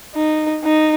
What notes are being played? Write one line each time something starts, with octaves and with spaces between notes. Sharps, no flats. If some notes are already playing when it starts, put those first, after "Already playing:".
D#4
D#4